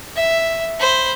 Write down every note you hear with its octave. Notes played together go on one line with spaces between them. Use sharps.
E5
C5 B5